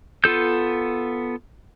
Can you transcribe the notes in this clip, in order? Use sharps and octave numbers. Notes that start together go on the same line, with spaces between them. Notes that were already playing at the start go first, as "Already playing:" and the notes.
B3 F4 A4 G6